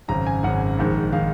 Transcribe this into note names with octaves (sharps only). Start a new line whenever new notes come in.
G#1 F#2 C#3 A#5
G#5
G#1 F#2 C#3 F#5
A#1 G#2 D#3
D#3 F5